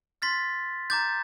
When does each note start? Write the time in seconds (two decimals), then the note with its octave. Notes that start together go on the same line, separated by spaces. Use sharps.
0.22 C6 F6 A6 B6
0.90 A#5 D6 G6 A6